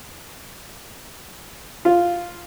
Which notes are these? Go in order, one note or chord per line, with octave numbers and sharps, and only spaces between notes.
F4